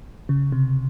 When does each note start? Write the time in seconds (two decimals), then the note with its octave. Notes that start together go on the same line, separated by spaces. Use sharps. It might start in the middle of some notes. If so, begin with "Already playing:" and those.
0.29 C#3
0.52 C3